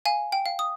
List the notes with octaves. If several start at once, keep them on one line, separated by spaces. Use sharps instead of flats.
F5 G#5
G5
F5
D#6